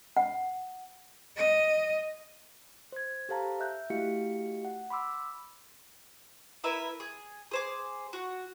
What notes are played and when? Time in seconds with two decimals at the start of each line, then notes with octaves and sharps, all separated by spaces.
0.17 F#5
1.37 D#5
2.92 C5 G#6
3.29 G4 A4 C5 F5 A5 A#5
3.60 E5 F#6 G6
3.90 A3 E4 F#4 G4 F5 C#7
4.65 F#5
4.90 B5 C6 D6 E6
6.64 E4 A#4 B4 E5
7.00 G#4
7.51 G#4 C5 D6
8.13 F#4